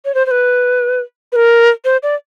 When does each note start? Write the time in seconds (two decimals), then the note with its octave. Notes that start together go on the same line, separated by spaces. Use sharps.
0.05 C#5
0.15 C5
0.26 C5
0.31 B4
1.32 B4
1.36 A#4
1.85 C5
2.03 D5